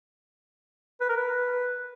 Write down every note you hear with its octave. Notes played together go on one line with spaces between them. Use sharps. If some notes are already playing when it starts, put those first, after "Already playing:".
B4
A#4
B4